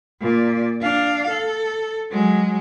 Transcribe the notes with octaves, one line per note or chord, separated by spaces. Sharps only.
A#2 D5
D4 F5
A4
F#3 G#3